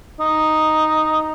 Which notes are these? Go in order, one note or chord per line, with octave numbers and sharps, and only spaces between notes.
D#4